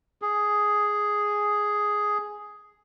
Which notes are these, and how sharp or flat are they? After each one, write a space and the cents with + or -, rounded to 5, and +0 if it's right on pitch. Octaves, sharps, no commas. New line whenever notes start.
G#4 +5